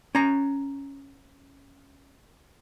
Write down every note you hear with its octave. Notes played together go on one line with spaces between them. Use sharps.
C#4 A#5